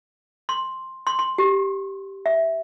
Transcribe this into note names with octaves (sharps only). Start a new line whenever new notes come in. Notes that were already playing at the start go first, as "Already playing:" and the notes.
C6
C6
C6
G4
E5